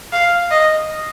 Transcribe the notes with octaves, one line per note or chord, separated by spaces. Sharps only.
F5
D#5